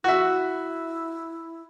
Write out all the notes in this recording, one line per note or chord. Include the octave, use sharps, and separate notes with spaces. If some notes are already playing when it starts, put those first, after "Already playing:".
E4 F#4 E5